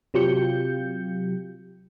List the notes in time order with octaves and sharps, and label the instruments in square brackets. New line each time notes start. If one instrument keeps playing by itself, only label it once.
[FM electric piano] C3 F#3 F4 G4 G6 C#7